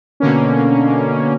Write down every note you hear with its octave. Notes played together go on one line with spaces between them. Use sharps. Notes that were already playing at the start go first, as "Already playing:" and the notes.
B2 D3 A#3 C#4